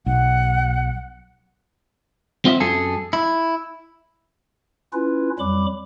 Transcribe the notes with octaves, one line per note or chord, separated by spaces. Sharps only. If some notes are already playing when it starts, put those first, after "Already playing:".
B1 F#5
C4 F4 D#5 E5
F#2 G#4 A4
E4
C#4 E4 F4 B4
F2 F#3 G3 B5 D6